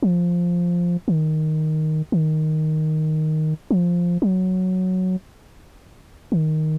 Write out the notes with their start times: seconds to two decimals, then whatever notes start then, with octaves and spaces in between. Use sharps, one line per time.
0.03 F3
1.08 D#3
2.12 D#3
3.71 F3
4.22 F#3
6.32 D#3